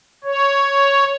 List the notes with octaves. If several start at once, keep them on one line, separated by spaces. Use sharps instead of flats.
C#5